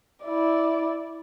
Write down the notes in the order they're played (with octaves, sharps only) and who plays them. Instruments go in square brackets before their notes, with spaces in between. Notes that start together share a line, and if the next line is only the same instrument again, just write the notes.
[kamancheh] E4 D5